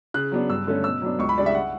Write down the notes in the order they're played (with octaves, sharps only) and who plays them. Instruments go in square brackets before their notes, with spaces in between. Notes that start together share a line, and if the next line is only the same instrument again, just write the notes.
[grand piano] C#3 F#6
F#3 B3 D4
G2 E6
D3 A3 C#4
B2 E6
F#3 B3 D4
C#2 C#6
B5
C#3 G3 D4 D5
E5
F#5